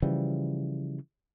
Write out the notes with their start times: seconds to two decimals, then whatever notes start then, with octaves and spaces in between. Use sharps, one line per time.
0.02 C#3 E3 F3 G3